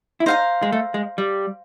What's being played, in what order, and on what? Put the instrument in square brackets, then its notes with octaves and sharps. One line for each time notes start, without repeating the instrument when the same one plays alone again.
[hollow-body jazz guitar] E4
[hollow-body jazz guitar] D#4 [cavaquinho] C5 F5 A#5
[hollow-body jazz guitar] G#3
A3
G#3
G3